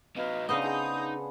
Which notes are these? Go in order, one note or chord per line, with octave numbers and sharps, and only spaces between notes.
C3 F#3 B4 D#5 F5
C#3 B3 D4 D#4 C5 D#5 D#6
G#4 A4 F#5 D#6 G6